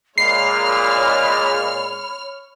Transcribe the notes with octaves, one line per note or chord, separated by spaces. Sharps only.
A#2 G#3 C#5 B5 F6 C7